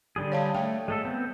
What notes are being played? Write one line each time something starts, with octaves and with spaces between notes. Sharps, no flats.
D3 G3 G#4
C#5 F5 A5
A3 G5
G#3 A3 A4
B3 C4